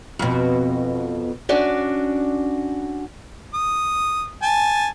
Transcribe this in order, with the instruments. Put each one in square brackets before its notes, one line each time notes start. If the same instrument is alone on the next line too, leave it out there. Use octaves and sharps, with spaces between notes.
[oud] F2 B2
[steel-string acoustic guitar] C#4 D4 F#4 D5
[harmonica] D#6
G#5 A5